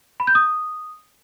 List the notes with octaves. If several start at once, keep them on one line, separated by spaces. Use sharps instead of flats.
B5
G6
D#6